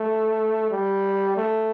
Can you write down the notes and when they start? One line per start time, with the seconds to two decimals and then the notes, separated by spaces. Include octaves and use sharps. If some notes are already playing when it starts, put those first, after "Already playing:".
Already playing: A3
0.71 G3
1.37 A3